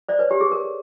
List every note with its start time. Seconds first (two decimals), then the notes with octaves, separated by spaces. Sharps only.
0.09 C5 D5
0.19 B4 C#5
0.31 G4
0.41 G#4
0.52 A#4